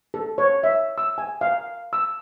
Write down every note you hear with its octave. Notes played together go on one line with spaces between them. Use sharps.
A4
C#5
E5
E6
G#5
F5
E6